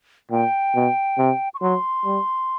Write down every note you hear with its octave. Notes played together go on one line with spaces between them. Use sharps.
A#2 G5
B2
C3
C#6
F#3 C6
G3